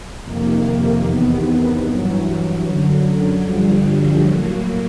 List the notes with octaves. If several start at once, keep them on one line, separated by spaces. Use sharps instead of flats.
F2 C3 D#3 A#3
E2 C3 D#3 B3
B3
G2 E3 F#3
F#2 D3 F#3
G2 D3 F3 G3
F#3
A2 F#3 A#3